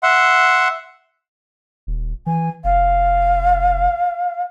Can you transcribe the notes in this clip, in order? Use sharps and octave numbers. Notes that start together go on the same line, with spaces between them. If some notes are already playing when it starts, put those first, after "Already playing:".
E5 F#5 C6
D#1
E3 G#5
F1 F5